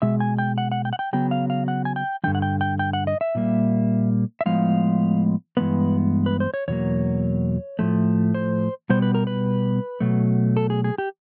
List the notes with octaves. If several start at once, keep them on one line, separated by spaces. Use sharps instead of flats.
B2 G#3 E5
G#5
G5
F#5
F#5
G5
F#5
G5
C#3 F#3 B3 G5
F5
F5
F#5
G#5
G5
G2 D3 F3 G5
F#5
G5
G5
G5
F#5
D#5
E5
A#2 G3 A#3
E5
A2 F3 G#3 B3 F5
G2 E3 G#3 B3 B4
B4
C5
C#5
E2 B2 F#3 A#3 C#5
A2 F3 A3
C5
B2 G3 B3 C5
B4
A#4
B4
B2 F#3 A3
A4
G#4
G#4
G4